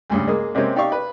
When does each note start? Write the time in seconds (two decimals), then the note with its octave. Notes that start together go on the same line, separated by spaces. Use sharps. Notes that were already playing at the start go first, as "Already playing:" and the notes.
0.10 D2 G2 C#3
0.27 G#3 A#3 G#4
0.55 C3 G#3 A#3 C4 C#4
0.76 D#4 G4 D5 F5 C#6
0.92 B4